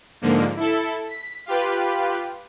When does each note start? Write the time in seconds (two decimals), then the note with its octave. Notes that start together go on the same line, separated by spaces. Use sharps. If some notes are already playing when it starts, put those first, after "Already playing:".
0.22 G#2 D3 F3 A#3
0.57 E4 A4
1.08 B6
1.46 F4 G4 B4